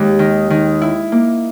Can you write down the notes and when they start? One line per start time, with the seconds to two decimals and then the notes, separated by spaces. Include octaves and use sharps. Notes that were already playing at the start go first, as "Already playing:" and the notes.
Already playing: D#2 G#3
0.19 D#3
0.50 D#3
0.82 E4
1.12 A#3